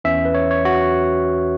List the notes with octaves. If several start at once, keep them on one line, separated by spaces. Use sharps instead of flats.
E2 E3 C#4 E5
B4
C#5
C#5
F#4